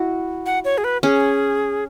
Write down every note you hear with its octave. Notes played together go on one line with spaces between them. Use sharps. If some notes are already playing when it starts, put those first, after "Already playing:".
Already playing: E4 F#4
F#5
C#5
G#4
B4
C#4 G#4